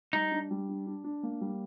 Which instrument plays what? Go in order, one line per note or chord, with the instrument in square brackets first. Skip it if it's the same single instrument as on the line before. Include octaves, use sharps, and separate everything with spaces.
[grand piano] G3 [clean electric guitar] D#4
[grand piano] D4
G3
D4
D4
D4
A#3
G3